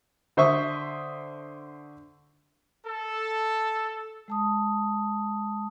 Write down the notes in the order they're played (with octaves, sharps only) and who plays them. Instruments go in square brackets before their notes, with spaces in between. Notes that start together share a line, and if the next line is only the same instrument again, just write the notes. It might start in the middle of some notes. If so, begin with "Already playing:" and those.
[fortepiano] D3 C5 E5 C#6 D#6
[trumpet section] A4
[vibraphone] G#3 A5 D#6